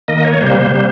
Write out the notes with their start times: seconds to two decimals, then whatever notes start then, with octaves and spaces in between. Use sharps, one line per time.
0.08 D#3 A#3 D#5
0.25 C#5
0.41 C3 G3 A#3 C5
0.74 C3 G3 A#3